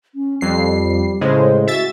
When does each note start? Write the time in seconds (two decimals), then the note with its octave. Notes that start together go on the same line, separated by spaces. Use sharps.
0.15 C#4
0.41 F2 G3 C7
1.21 A2 C#3 G#3 C5
1.67 F#4 E5 A6